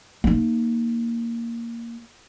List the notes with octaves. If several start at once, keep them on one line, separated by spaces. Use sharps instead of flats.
A#3 D#4